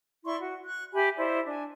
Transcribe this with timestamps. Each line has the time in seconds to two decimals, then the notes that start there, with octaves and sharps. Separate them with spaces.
0.25 E4 D5 C6 C#6
0.41 F#4
0.65 C#6 F#6
0.94 G4 E5 G#5 B5
1.17 E4 C5 D5 D#5
1.47 D4 G#5